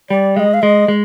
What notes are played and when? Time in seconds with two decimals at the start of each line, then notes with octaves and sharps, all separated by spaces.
0.10 G3 D5
0.36 G#3 D#5 F5
0.54 F5
0.62 G#3 D#5
0.88 G#3